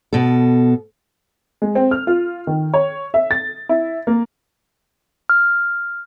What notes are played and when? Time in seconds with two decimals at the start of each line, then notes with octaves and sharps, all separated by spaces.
0.13 B2 A4
1.62 G#3
1.75 C4
1.91 F6
2.07 F4
2.47 D#3
2.74 C#5
3.14 E5
3.31 A6
3.69 E4
4.07 A#3
5.29 F6